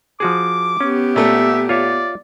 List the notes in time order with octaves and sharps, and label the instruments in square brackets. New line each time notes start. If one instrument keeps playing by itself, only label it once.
[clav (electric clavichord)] F3 F#4 G#4 [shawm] D6
[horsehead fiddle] B3 G4 [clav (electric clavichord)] C#4
[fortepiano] A#2 A3 [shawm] E5
[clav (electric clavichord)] F4 C#5 E5 [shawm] D5